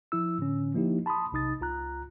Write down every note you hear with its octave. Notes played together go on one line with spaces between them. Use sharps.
F3 E4 E6
A2 D3 C#4
F3 A#3 D#4 E4 G4
A5 B5 C6 D#6
B1 C3 D#4 D#6 A6
C#2 F4 A#5 F#6